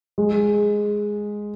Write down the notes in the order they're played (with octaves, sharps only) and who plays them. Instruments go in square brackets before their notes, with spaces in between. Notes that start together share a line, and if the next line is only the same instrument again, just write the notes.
[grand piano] G#3